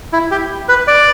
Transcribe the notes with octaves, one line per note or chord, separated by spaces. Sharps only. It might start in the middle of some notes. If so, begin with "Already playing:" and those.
E4
G4
B4
D5